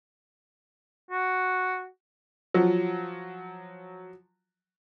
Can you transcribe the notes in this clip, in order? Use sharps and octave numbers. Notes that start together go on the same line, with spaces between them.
F#4
F3 F#3